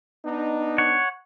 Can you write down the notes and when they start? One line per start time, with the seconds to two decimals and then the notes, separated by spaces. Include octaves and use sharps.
0.24 B3 D4 D#4
0.78 C#5 F#5